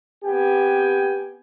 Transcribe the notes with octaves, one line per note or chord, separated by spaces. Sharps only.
B3 C4 G4 G5 G#5